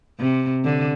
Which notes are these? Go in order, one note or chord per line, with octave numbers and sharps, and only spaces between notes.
C3
D3